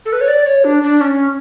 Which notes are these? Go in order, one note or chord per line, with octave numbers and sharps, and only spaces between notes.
A4
B4
C#5
D5
C#5
D4
D4
C#4